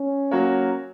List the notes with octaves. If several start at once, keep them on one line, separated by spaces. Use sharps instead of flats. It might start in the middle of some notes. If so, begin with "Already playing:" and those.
Already playing: C#4
F#3 A#3 F#4 A#4 C#5